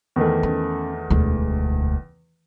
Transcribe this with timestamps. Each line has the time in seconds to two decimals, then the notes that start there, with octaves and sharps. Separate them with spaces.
0.16 E2 D#3 A3
0.43 C#4
1.10 E1 D2